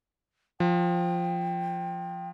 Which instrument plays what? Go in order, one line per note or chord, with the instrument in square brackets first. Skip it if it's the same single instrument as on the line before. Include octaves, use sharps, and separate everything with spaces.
[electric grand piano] F3 [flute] G5